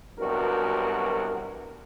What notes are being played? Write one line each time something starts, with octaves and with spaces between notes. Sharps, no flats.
C2 G2 B2 F#3 F#4 A#4